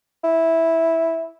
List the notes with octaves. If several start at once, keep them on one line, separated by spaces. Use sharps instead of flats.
E4